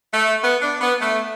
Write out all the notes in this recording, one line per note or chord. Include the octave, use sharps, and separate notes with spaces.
A3
B3
D4
B3
A3